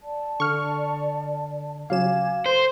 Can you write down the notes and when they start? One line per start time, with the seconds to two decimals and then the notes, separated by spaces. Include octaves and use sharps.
0.03 D5 A5
0.40 D3 C#6 F6
1.90 C#3 F#3 F5 G#5 D6 G#6 E7
2.46 A4 C5 C6